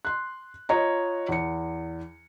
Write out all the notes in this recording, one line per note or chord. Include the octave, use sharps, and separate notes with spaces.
C6 F#6
F4 C#5 D#5 A#5
E2 C#7